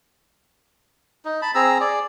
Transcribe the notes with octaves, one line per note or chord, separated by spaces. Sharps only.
D#4
A5 B5
C4 G#4 A#5 E6
G#4 D5